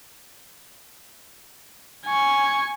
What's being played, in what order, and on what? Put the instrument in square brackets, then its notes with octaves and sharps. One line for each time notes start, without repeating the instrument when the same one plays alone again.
[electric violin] G#5 C#6